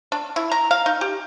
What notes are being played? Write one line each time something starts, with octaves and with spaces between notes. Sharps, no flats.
D4
E4
A#5
F5
D#4
G4